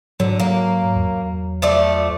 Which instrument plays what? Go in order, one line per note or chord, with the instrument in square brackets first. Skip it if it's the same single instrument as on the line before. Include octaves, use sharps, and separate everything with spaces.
[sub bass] G#2 [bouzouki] D3 [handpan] F#3
[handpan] F#3 [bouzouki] A#3
[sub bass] E2
[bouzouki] F3 A3 D5